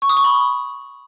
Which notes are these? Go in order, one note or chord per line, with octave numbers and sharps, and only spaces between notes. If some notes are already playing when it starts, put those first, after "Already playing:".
C#6
D#6
C#6
B5